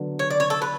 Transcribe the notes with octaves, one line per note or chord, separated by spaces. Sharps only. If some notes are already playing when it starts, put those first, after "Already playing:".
Already playing: D3 F#3 B3
C#5
D5
C#5
A4
B4